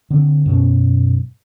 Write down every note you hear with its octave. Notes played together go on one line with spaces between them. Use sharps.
D3 C4
F#2 B2 C#4